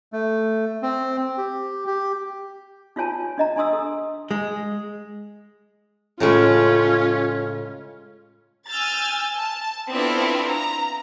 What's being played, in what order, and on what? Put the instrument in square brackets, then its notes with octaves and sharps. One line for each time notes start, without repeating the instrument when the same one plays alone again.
[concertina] A3
C4
G4
G4
[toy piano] D#4 F4 F#4 C#5 G#5 A5
D4 D#5 A#5
D4 G#5 C6 D#6 E6
A4
[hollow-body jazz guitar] G#3
[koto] A2 C#3 G#3 [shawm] C#4 [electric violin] F4
[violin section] G#5 E6 F6 G6 A6
A5
B3 C4 D4 E4 F4 A4
A#5